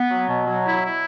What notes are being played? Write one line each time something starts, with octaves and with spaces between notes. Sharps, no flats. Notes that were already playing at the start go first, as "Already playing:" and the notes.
Already playing: B3
F#3
B2
F#3
E4
E4